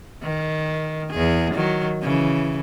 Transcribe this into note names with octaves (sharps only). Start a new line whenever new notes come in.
D#3
E2 G#4
D#3 F#3
C#3 E3